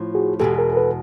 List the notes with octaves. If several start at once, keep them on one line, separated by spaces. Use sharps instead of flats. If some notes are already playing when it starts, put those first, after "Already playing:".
Already playing: A2 F3
F#4 G#4
E2 B2 G#3 G4 A4
G#4 A#4
A#4
A4 B4